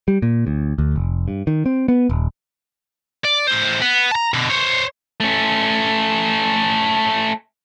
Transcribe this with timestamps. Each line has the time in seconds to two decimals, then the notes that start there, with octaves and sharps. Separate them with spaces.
0.08 G3
0.22 A#2
0.47 D2
0.78 D2
0.96 F1
1.28 G2
1.47 D#3
1.66 C4
1.88 B3
2.09 D#1
3.25 D5
3.48 A2 C5
3.82 B3
4.11 A5 A#5
4.34 B2 D3
4.50 C5 C#5
5.20 A3 C#4